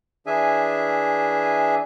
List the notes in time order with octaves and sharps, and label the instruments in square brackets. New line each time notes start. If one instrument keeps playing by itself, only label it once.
[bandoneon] E3 D4 G#4 E5 G#5